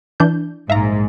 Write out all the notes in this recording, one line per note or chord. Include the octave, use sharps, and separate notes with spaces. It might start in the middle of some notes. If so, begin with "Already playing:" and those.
E3 D4 G6
A#1 G#2 E5 F5 A#5